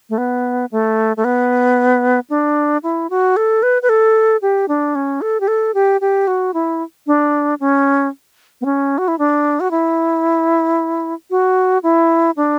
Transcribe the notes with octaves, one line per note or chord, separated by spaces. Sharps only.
A3
B3
A3
A3
B3
D4
E4
F#4
A4
B4
B4
A4
G4
D4
C#4
A4
G4
A4
G4
G4
F#4
E4
D4
C#4
B3
C#4
F#4
E4
D4
F#4
E4
F#4
E4
D4